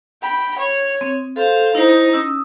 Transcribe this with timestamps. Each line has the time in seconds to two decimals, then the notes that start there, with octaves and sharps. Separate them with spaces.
0.22 G5 B5
0.58 C#5
1.01 C4
1.36 A4 C5 F5
1.75 D#4 E4 C5
2.13 C#4 D#6 E6